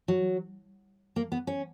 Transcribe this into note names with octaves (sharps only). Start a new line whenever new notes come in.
F#3
A#3
B3
C#4